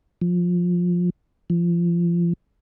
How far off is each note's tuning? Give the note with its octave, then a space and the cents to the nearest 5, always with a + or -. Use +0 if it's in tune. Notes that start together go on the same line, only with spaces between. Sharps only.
F3 +15
F3 -25